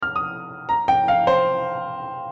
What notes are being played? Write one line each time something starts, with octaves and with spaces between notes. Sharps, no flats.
F6
D#6
A#5
G5
F5
C5